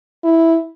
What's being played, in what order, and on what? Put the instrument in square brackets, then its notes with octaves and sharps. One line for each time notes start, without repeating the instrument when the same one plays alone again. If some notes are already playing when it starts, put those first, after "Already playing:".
[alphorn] E4